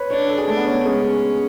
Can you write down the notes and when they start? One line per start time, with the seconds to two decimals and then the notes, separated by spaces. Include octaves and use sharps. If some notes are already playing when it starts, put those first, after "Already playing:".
Already playing: B4 C#5
0.10 D4 C#5
0.29 A4
0.38 G#4
0.48 A3 D4
0.57 B3
0.67 C#4
0.85 G#3 C#4